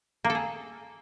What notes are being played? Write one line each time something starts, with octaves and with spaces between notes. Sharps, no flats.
A#3
A4
G#4